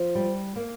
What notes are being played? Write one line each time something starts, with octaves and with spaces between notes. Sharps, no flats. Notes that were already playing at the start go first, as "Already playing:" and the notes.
Already playing: F3
G3
A#3